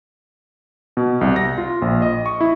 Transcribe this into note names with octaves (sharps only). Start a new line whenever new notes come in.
B2
C2
A#6
F4
A#1
D#5
C#6
E4